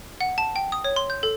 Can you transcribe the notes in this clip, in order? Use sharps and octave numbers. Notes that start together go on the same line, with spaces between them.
F#5
A5
G5
D#6
C#5
C6
G6
A4